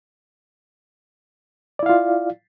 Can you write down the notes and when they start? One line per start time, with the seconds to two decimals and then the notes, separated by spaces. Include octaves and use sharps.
1.79 D5
1.83 E4
1.86 F5
1.89 F4